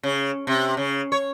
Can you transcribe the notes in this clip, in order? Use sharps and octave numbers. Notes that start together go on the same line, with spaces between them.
C#3
C3
C#3
C#5